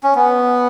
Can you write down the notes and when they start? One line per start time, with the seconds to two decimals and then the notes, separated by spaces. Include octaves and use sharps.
0.03 C#4
0.15 B3